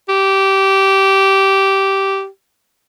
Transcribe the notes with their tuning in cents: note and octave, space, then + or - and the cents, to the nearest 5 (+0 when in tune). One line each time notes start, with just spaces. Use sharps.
G4 -15